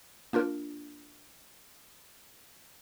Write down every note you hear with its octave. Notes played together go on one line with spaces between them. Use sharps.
A#3 D4 F4 A#4